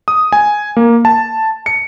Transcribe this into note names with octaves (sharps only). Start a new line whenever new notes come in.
D#6
G#5
A#3
A5
C#7